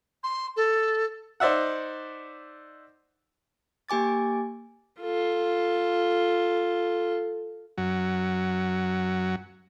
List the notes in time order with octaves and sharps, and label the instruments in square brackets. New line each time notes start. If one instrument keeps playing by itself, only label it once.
[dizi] C6
A4
[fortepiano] D#4 C5 D5 E5 F#5
[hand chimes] A#3 G4 G#5 D6 A6
[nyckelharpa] F4 A4
[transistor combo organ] F#2 F#3